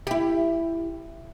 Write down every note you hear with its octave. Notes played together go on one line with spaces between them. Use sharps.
E4 G4